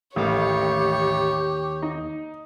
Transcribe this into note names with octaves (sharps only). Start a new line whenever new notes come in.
A1 D#2 G4 A#4 C#5 F5
D#4